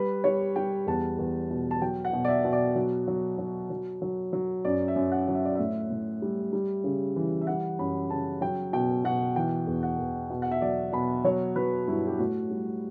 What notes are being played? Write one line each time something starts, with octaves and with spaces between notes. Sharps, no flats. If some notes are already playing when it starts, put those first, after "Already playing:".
Already playing: G3 B4
G3 C#5
G3 G5
E2 A5
E2
B2
A5
F#3 G5
F#5
B2
D5
E5
B2
D5
F#3
F#3
F#3
F#3
F#3
F#3
F#2 D5
E5
F#2
F#5
F#3
E5
D5
A2 E5
A2
G3
G3
C#3
E3
E5
G3 F#5
F#2 B5
C#3 A5
F#3 G5
B2 G5
B2 F#5
E3 G5
E2
F#5
E2
B2
F#5
E5
F#3 D5
B2 B5
F#3 C#5
F#3 B4
G2 E4
G4
A2 F#4
G3